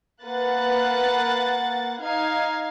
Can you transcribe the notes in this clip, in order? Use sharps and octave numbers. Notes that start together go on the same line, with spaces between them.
A#3 B4 F#5 F#6 A6
D#4 F5 G#6